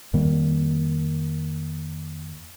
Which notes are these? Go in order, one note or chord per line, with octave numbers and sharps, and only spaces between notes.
F2 D#3 G3 A#3